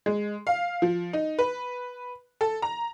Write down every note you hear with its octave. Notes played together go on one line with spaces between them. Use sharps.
G#3
F5
F3
D#4
B4
A4
A#5